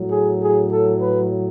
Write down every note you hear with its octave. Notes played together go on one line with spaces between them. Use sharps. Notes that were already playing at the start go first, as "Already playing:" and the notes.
Already playing: A2 F#3
G#4
G#4
A4
B4